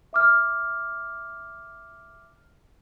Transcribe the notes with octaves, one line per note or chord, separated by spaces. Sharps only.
E5 D6 F6